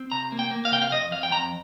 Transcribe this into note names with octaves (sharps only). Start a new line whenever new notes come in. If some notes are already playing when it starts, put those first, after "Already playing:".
Already playing: C4
C3 A#5
A#3
G5
A#3
F5
C3 G5
F5
F2 D#5
F2 F5
G5
F2 A#5